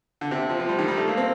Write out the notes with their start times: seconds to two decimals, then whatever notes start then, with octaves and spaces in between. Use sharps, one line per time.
0.21 D3
0.31 C3
0.49 F3
0.60 F3
0.69 G3
0.79 D#3
0.88 G3
0.98 A3
1.08 A#3
1.17 C4